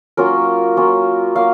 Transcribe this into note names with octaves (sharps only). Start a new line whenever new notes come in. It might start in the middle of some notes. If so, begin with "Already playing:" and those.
F#3 A#3 C#4 F4 A#4
F#3 A#3 C#4 F4
F#3 A#3 F5